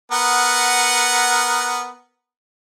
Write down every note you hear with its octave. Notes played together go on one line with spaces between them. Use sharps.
B3 A#4 F#5